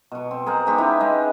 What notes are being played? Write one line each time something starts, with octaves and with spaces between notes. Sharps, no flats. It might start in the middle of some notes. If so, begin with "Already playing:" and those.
B2 C#6
C4
G#4 A#4 C5 F#5
G#3 B3 D#4 G4
C#4 D#4 E4 B4
G#3